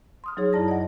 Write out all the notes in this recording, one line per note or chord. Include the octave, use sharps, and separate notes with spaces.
C6 D#6 F6
F#3 D#4 G#4 C#5
F#2 E4 D5 A5 A#6
D5 D#5 F#5